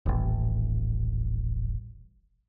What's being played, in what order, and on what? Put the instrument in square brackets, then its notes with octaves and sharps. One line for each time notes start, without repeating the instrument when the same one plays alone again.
[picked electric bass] D#1 A1